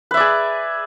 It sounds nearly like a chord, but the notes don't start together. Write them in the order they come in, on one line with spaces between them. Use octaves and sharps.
B4 E5 D5 G#4